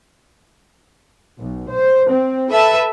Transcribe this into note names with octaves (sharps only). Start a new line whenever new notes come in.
B1
C5
C4
A4 B4 E5